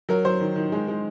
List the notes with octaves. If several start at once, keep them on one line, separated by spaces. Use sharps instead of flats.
F#3 A#4
F#3 C5
D#3
D#3
G#3
G#3